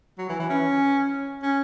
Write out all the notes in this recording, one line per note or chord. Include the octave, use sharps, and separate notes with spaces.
F#3
E3
E3
C#4
C#4